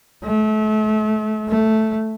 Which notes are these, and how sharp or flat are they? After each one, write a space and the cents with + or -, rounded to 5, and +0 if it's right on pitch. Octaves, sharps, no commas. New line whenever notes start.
A3 -35
A3 +0